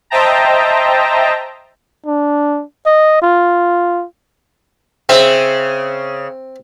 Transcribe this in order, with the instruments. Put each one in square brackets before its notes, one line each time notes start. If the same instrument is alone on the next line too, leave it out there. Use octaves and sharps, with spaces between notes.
[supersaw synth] C5 D#5 E5 G5 A5 A#5
[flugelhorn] D4
D#5
F4
[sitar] C#3 E5 [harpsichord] C4